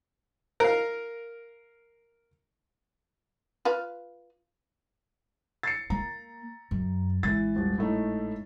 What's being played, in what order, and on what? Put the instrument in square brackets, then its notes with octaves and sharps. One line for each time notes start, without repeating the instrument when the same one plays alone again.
[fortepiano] A#4 F5
[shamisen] F4 B4 F5
[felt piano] A6 C7 C#7
[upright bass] A#3 [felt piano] A#5
[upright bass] F#2
[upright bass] G#1 [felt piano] E3 A6
[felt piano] D#1
A2 A3 D#4